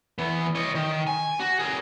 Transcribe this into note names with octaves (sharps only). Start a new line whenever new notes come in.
E3 B3
C#5 D#5
D#3
G#5
F#4
G#4 A#4